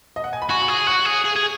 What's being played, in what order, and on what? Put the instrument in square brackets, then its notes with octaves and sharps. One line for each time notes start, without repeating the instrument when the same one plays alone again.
[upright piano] D#5
F#5
G#5
B5
[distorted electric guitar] F#4 [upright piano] G#5 C#6
[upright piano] G#5 C#6
[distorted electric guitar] G#4
[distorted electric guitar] F#4 [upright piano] C#6 F#6
[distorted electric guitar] G#4
G#4
G#4